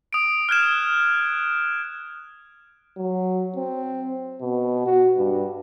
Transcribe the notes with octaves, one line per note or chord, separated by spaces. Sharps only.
D#6 D7
F6 F#6 G#6 E7
F#3
C4
B2
F#4
G2